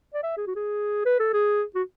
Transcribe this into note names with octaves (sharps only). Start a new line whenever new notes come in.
D5
E5
G#4
F#4
G#4
B4
A4
G#4
F#4